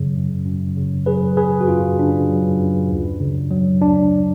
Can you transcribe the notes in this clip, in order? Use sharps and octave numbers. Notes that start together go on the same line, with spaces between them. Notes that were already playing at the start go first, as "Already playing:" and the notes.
Already playing: F#2 C#3 F#3
F#2
F#2
C#3
F#3 G#4 B4
F#2 G#4 B4
F#4
F#2 F4
C#3 D4
F#3
F#2
D2
C#3
F#3
D2 D4